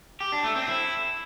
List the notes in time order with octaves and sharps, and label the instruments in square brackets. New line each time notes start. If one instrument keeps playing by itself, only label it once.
[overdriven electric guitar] G4
D4
A3
C4
E4